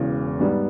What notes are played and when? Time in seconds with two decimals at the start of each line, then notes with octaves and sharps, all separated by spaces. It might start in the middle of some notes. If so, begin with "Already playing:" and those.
Already playing: E1 E2 C#3
0.40 G#2 G3 B3